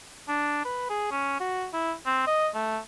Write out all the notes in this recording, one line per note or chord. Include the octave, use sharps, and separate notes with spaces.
D4
B4
G#4
C#4
F#4
E4
C4
D#5
A3